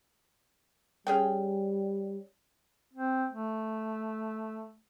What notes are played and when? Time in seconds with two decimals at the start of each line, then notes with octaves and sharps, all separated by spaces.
1.07 G3 C#4 G#4 G5
2.94 C4
3.32 A3